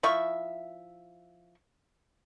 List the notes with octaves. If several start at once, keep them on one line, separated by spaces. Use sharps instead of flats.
F3 E4 E5 C#6